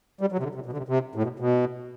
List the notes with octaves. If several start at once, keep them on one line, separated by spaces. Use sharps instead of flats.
G3
F#3
C3
D3
C3
B2
D3
C3
C3
A2
B2
B2